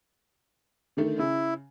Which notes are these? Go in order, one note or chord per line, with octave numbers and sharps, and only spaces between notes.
D3 D#3 A3
C#3 E4